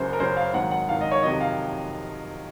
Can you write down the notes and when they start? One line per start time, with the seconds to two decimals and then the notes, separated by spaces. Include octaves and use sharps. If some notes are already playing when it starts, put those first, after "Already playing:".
Already playing: F#1 F#2 C#3 F#3 C5
0.13 A#4
0.20 F#1 F#2 C#3 F#3 C5
0.37 F5
0.54 G#1 G#2 D#3 F#3 F#5
0.71 F#5
0.89 G#1 G#2 D#3 F#3 F5
1.01 D#5
1.11 C#5
1.23 F2 C3 D#3 F#3 D#5
1.41 F5